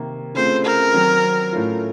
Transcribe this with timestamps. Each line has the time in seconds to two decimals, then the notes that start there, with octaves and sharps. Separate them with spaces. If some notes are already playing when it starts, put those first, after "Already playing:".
Already playing: C3 D#3 A#3
0.35 C#3 A3 C4 F4 C5
0.65 A#4
0.94 D#3 F#3 C4
1.53 A2 A3 C#4 F4